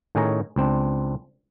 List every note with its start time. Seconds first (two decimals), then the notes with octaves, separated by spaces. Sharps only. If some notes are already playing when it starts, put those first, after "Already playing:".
0.15 A2 D#3 C#4 G#4 C#5 A#5
0.56 C#2 C4 D4